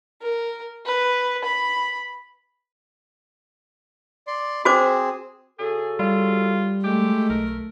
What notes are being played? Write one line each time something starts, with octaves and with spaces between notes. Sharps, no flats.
A#4
B4
B5
D5 C6
C4 F#4 G#4 C5 D6
C#3 F#4 G#4 A4
G3 F4
G#3 A3 G4
B1 A#4